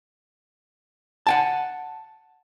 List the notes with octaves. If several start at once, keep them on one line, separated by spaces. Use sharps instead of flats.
F#5 G5 A5